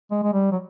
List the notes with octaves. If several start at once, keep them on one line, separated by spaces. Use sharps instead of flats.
G#3
G#3
G3
F#3